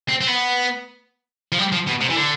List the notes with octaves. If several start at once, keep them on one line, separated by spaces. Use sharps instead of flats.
C4
C4
B3
F3
G3
F3
B2
C3
E3
D3